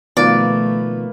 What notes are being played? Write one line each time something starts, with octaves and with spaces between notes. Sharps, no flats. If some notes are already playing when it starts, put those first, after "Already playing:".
B2 D#3 F3 A3 A#3 B4 D5